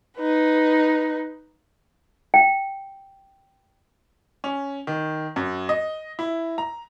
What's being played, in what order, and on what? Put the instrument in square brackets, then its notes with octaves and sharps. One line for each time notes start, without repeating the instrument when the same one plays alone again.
[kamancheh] D#4 B4
[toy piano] G5
[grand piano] C#4
D#3
F#2
D#5
E4
A#5